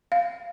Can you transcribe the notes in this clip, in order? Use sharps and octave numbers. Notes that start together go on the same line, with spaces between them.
F5